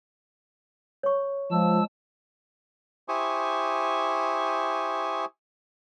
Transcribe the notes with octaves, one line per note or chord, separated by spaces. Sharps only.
C#5 C#6
F3 G#3 A5 E6
E4 G4 C5 G#5 C#6 D#6